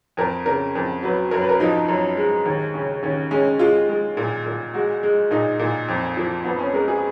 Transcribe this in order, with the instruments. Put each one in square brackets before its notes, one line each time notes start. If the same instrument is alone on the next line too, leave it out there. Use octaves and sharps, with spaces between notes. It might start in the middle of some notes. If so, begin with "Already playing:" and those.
[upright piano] F2 A#4
C#3 A#4
F2 A#4
F#3 B4
F#2 A#4
B4
A#4
F3 D#4
F#2
G#3
D#2
C#3 C#4
D#2 C#4
G#3 C#4
G#3 F4
G#3
A#2
A#2
G#3 F#4
G#3
A#2 D#4
A#2
F2
F3
F2 B3
C#4
G#3 A#4
G#4